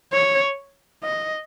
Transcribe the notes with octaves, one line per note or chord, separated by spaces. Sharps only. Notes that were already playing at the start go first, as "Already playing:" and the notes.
C#5
D#5